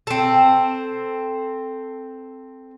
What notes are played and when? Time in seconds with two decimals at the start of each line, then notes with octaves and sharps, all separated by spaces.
0.07 C4 A4